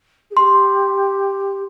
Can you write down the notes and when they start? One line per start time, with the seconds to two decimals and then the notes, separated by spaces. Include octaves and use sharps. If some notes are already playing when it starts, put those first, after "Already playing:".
0.31 G#4
0.36 G4 C6